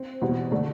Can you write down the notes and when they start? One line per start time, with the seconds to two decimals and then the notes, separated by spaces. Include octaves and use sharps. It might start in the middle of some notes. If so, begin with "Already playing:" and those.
Already playing: C4
0.22 E2 B2 G3 B3
0.51 D3 A3 D4